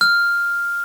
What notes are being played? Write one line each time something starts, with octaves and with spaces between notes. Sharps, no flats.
F6